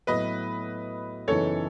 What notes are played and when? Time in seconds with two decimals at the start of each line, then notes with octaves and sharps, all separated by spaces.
0.07 A2 F#3 B3 B4 D#5
1.28 F#2 C#3 E3 B3 D#4 A4 C#5